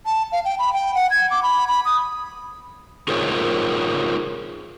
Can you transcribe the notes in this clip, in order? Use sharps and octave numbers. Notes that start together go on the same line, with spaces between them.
A5
F5
G5
B5
G5
F#5
G#6
D6
B5
B5
D#6
D#4 F4 G#4 A#4 C5 C#5